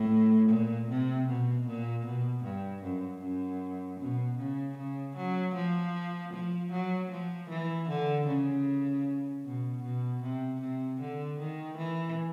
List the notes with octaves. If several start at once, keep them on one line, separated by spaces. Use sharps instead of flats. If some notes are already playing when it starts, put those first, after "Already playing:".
Already playing: A2
A#2
C3
B2
A#2
B2
G2
F#2
F#2
B2
C#3
C#3
F#3
F3
F3
F#3
F3
E3
D3
C#3
B2
B2
C3
C3
D3
D#3
E3